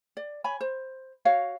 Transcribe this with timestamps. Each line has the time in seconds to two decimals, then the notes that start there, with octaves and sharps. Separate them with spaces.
0.17 D5
0.44 C#5 G#5 B5
0.61 C5
1.25 F#4 C#5 F5